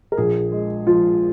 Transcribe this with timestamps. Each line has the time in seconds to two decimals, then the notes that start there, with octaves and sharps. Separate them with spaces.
0.12 A#4
0.17 A#1 G#4
0.52 G#3
0.87 F3 F4